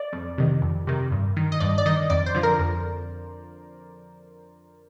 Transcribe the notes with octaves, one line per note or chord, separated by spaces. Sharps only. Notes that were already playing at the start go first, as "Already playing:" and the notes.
Already playing: D5
F2
C3 D#3
F2
C3 D#3
G2
D#3
D#5
G2 D5
D5
D#3 D#5
F2 D5
C5
D3 F3
A#4
F2